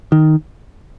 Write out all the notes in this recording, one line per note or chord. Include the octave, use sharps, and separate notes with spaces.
D#3